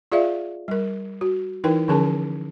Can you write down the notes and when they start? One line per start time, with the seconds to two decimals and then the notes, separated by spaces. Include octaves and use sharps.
0.12 F4 G#4 D5 E5 F5
0.68 G3 A#4
1.21 F#4
1.64 E3 D#4 E4 A#4 B4 G5
1.88 D3 F3 C#4 G#4 A#4 A5